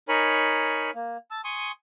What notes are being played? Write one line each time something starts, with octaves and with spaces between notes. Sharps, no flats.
D#4 A#4 C#5 G#5 B5
A#3
A5 E6
G#5 C6 C#6 D#6